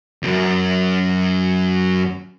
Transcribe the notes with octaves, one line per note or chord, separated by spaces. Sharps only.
C#2 F#2